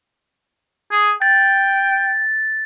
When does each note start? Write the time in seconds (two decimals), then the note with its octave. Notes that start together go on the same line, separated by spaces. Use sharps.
0.91 G#4
1.22 G5 A6